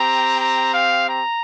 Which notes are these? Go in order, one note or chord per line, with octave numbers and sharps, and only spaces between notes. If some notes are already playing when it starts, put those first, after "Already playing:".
Already playing: C4 G4 A#5
A#5
F5
A#5